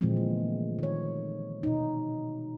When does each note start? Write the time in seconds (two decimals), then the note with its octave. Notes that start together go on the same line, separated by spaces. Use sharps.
0.01 A#2 D3 E3 F3 G#3 C4
0.17 A3
0.79 D#3 C#5
1.63 B2 D#4